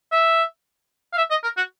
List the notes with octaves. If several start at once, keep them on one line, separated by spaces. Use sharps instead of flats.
E5
F5
E5
D#5
A#4
F#4